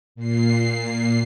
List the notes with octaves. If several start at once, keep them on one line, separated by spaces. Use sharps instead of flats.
A#2 C7